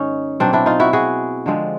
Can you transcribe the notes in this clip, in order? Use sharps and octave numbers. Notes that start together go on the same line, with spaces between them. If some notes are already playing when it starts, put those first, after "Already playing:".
Already playing: G#2 D#3 C#4 D#4
B2 F#3 A#3 C4 D4
D4 E4
D#4 F4
E4 F#4
F#4 G#4
D3 F3 G#3 C4